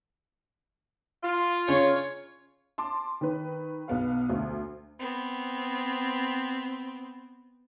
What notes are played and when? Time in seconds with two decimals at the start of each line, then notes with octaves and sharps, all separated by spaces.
1.23 F4
1.68 C#3 C#5
2.78 A5 C6 D6
3.21 D#3 B4
3.88 B1 B3 F5
4.29 D2
4.99 B3 C4